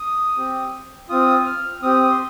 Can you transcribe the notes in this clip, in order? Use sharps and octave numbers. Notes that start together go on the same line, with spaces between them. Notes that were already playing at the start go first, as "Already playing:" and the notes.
Already playing: D#6
C4 G4
C4 F4 D#6
F6
C4 G4 D#6
D#6
C6